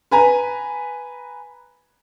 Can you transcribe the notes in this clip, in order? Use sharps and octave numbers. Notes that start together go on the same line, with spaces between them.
B4 G#5 A#5